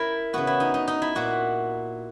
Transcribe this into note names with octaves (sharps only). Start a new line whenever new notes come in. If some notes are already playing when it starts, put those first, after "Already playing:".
Already playing: E4 A#4
C#3 E3 B3 F#4
E4
D#4
D#4
D#4
E4
A#2 A#3 F#4